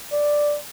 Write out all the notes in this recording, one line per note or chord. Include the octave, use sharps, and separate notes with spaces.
D5